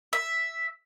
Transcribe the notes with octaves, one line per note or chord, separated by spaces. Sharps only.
E5